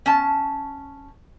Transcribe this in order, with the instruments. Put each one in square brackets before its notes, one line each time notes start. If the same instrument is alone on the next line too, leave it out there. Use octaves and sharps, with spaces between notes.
[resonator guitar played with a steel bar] C#4 A5